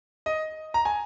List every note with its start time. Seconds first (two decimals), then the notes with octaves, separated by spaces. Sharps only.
0.26 D#5
0.74 A#5
0.85 G#5